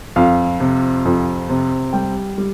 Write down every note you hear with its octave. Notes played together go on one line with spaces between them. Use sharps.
F2 F5
C3
F2
C3
G3 G5
G3